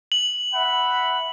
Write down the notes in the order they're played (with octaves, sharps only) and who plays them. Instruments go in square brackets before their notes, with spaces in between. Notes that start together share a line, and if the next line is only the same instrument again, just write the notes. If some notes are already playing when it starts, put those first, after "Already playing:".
[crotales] F#7
[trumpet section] E5 F#5 B5